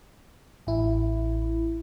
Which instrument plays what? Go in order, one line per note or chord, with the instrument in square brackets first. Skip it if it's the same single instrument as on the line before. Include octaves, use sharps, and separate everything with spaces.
[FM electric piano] A1 E4